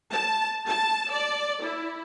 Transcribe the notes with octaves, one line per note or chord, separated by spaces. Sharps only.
A5
A5
D5
E4